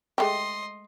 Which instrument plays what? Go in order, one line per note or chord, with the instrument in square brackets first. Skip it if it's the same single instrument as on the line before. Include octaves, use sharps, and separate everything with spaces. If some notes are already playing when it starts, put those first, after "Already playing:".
[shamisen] G#3 A3 G4 [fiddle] D#5 C6